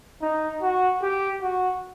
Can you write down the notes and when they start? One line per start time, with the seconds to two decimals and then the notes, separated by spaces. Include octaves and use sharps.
0.22 D#4
0.62 F#4
1.02 G4
1.42 F#4